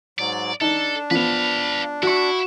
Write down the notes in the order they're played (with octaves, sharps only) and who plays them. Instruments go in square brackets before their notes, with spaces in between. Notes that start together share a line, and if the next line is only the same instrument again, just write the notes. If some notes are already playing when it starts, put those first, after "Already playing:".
[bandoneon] G#2 F#3 [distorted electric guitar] D5
[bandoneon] D4 [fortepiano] D#4 [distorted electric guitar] A4
[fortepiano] F3 B3 [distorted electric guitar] B4 F5
[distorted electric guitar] E4 [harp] F#4 C#6